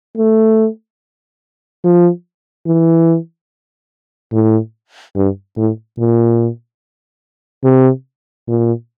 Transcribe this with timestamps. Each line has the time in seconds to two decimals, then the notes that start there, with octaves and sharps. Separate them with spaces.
0.17 A3
1.84 F3
2.66 E3
4.32 A2
5.15 G2
5.57 A2
5.98 A#2
7.64 C3
8.48 A#2